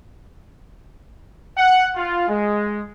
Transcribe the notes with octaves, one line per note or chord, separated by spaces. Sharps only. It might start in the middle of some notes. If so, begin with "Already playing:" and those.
F#5
F4
G#3